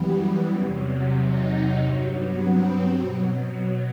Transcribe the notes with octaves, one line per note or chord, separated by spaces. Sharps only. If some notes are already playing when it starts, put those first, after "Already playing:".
Already playing: F#2 E3 G3 B3
E2 C3 F#3
D#4
G2 F#3 C4
B3
C4
B2 F#3